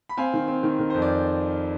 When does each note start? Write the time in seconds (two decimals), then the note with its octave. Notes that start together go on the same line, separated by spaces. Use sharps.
0.09 B5
0.17 C4 F5 G#5
0.33 D#3
0.48 C4
0.63 D#3
0.79 D#3
0.90 F2 C5
1.02 D5